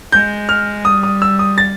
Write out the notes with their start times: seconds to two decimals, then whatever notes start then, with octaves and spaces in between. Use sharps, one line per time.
0.12 G#3 G6
0.49 F6
0.85 G3 D#6
1.03 D#6
1.22 E6
1.39 D#6
1.58 A6